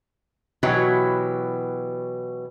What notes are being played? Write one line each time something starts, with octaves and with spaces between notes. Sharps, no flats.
B2 E3 F#3 E4 G4 C#5